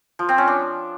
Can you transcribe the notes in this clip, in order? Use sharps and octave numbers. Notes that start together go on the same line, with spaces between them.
F3
C4
C#4
D4